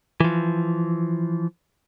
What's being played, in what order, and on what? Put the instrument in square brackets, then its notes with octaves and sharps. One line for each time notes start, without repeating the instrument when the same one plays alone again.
[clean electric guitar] E3 F3